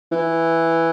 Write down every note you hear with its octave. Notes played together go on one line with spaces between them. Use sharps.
E3